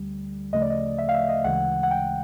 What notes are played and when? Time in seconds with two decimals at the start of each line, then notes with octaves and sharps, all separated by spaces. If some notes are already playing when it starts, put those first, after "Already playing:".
Already playing: D2 D3 G3
0.53 D2 C#3 F3 A3 D#5
0.62 D5
0.70 D#5
0.98 E5
1.09 F5
1.14 E5
1.29 D#5
1.44 D2 C#3 E3 G#3 F#5
1.83 F#5
1.91 G5